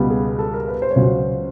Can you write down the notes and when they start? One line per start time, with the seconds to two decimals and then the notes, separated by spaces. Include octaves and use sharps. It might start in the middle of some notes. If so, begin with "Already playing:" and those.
Already playing: C#2 B2 G3 B3
0.10 G#4
0.39 A4
0.54 A#4
0.68 B4
0.82 C5
0.91 C#5
0.96 C#2 C#3 F#3 C5